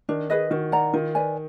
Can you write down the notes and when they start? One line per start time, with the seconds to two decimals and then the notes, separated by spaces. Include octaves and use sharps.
0.09 D#3 D4
0.30 G#4 B4 D#5
0.51 D#3 F#4
0.72 D5 F#5 A#5
0.93 D#3 F4
1.15 B4 D5 G#5